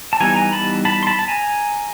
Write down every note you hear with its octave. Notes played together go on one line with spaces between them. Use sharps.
A5
E3 G3 B3 D#4 G#5 A#5
G#5 A#5
A5 B5
A5 B5
C6
A5 B5
A5
G#5 A#5